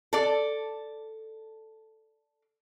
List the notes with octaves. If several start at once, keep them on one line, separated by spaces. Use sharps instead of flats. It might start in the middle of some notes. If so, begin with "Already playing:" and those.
A4 D5